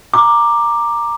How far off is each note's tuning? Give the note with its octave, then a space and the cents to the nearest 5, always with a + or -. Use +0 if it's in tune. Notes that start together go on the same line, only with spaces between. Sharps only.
A#5 +0 D6 +10